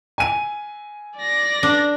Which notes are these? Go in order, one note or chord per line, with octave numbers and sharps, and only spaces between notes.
G#5 D#7
D5 A#6
D4